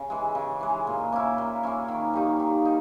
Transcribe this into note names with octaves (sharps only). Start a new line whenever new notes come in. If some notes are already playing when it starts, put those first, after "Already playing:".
Already playing: C#3
E3 G#3
C#3
E3 G#3
A#2
A#3 C#4 E4
A#2
A#3 C#4 E4
D#3
G3 A#3 D#4
D#3
D#4